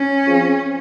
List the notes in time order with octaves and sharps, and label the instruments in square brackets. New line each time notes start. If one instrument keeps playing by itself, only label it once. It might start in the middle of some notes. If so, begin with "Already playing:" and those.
Already playing: [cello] C#4
[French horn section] F3 C4 F4 G#4